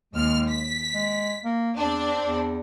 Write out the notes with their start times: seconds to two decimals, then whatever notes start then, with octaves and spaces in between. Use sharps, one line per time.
0.14 D#2 G#3 F6
0.50 B6
0.94 G#3
1.45 A#3
1.77 E2 C4 D4
2.24 E2